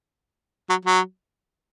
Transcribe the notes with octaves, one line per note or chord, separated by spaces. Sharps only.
F#3
F#3